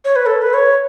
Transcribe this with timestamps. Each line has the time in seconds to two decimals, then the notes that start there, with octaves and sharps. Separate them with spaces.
0.05 C#5
0.16 B4
0.26 A4
0.42 B4
0.54 C#5